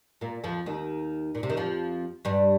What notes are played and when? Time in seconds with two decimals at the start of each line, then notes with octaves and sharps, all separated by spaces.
0.21 A#2 A#3
0.44 F2 F3
0.66 D#2 D#3
1.35 A#2
1.43 C3
1.50 D#3
1.57 F2 F3
2.25 G2 G3